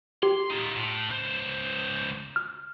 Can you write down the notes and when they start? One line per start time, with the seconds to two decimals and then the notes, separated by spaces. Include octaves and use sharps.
0.23 G4 C6
0.51 D#4 F4
0.76 A2
1.11 C#2 C5
2.36 F6